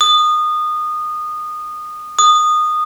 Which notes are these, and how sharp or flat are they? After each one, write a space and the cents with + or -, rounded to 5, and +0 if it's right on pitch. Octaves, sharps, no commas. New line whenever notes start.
D#6 -20
D#6 -15